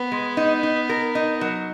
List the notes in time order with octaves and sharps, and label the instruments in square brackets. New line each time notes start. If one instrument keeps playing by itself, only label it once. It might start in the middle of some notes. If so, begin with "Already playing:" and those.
Already playing: [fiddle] B3
[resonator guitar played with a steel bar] G#3
D#4
D#4
A#4
D#4
F#3